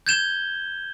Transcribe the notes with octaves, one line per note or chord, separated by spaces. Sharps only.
G6 G#6 E7 G7